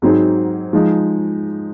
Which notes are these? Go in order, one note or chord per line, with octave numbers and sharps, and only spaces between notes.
G#2 F#3 C4 D#4 G#4
F3 G#3 D#4